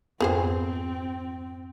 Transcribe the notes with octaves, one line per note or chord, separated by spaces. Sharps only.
F2 G#2 B3 C4 G#4 C5 G5